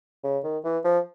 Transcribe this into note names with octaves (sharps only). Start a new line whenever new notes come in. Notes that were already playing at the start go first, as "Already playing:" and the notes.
C#3
D#3
E3
F3